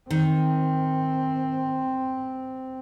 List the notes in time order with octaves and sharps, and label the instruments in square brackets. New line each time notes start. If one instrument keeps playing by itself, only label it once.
[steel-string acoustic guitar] D#3 [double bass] C4